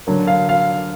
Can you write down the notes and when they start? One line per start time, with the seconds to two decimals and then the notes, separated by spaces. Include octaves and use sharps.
0.07 D3 F#3 A#3
0.27 F5
0.49 F5